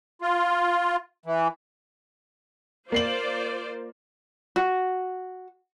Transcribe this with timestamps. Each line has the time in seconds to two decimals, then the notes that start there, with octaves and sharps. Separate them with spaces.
0.22 F4
1.26 E3
2.92 A#3 F4 C5 D5 C7 F#7
4.56 F#4